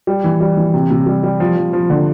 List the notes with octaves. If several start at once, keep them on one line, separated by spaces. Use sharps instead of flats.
G3
E3
G3
E3
C3
C3
G3
G3
F3
F3
F3
D3